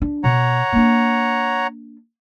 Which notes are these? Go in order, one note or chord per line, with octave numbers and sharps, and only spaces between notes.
D4
B2 C#5 F#5 A#5
A#3 D4